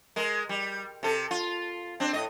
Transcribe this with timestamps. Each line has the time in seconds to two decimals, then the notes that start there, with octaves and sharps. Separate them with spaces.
0.16 G#3 A#4
0.49 G3
1.03 C3 A4
1.31 F4
2.00 C4 D4
2.13 A2 D#5